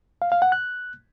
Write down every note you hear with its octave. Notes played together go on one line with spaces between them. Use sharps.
F5
F5
F#5
F#6